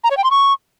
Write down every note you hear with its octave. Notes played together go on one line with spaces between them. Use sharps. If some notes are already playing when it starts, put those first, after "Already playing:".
A#5
C#5
G5
C6
C#6